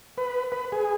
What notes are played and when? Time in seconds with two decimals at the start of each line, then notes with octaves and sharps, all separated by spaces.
0.18 B4
0.52 B4
0.72 G#4